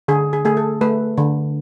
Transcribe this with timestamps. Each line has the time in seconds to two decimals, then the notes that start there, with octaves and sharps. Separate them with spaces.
0.08 D3 G#4
0.33 G#4
0.45 A3 G#4
0.57 A4
0.81 A3 B4
1.17 D3